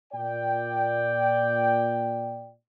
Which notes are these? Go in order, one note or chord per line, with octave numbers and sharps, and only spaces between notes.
A#2 D5 G5